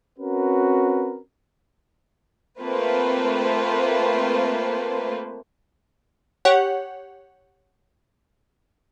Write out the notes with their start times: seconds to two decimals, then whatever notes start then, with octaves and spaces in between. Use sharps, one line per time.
0.19 C4 C#4 F#4 A#4 B4
2.60 A3 A#3 C4 F4 B4 C5
6.45 G4 C#5 F#5